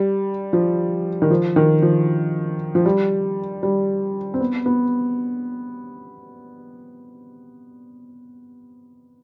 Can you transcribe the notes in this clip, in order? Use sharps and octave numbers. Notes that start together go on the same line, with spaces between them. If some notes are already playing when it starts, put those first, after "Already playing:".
Already playing: G3
F3
D#3
F3
D#3
F3
F3
G3
G3
C4
B3
B3